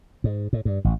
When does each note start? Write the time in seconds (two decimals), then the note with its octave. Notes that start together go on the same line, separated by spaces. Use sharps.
0.24 G#2
0.53 A2
0.65 G2
0.85 A1